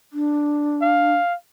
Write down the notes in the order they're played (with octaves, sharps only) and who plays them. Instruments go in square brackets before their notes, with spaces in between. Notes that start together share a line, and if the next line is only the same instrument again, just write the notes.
[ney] D4
[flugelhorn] F5